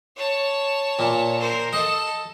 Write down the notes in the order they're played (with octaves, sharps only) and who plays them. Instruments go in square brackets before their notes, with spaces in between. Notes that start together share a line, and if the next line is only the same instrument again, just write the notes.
[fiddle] C#5 A5
[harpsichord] A#2
[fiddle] A#4 C5
[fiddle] A4 A5 [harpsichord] D#5